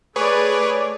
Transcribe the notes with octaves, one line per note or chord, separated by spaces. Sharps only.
A3 G#4 B4 C#5 D5